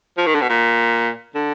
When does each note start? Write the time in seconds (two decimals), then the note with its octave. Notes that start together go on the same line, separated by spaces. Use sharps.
0.18 F3
0.26 D#3
0.35 D3
0.41 B2
0.49 A#2
1.35 D3